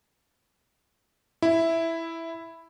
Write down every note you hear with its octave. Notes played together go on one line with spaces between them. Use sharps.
E4